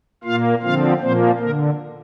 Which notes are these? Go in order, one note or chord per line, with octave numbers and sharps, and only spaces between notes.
A#2 A#3 F4 F5
D3 F3 C4 F4 F5
A#2 F3 A#3 C4 C5
D3 A#3 A#4